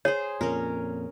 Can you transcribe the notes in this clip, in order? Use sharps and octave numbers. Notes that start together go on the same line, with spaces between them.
G#4 C5 C#5
F2 A#2 C#4 A#4